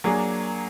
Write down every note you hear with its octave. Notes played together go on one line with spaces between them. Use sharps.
F#3 A#3 D4 G#4